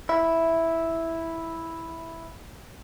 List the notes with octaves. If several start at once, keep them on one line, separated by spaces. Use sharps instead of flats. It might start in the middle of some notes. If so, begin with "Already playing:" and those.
E4 E5